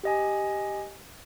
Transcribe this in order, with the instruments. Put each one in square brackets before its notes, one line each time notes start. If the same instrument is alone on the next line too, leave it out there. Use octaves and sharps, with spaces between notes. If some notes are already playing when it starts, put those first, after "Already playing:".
[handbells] G4 D#5 G#5